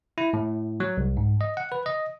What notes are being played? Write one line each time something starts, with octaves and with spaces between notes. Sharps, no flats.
E4
A2
F#3
C2
G#2
D#5
F#5
B4
D#5